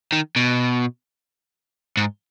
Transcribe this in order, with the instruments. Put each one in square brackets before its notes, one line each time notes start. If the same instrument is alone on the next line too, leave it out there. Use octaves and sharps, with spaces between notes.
[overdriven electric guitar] D#3
B2
G#2